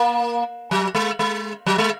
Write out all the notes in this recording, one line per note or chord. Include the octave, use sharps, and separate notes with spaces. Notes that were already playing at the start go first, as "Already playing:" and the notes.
Already playing: A#3
F#3
G#3
G#3
F#3
G#3